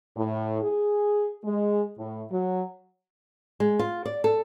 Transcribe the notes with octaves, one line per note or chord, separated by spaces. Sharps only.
A2
G#4
G#3
A2
F#3
G#3
F4
D5
A4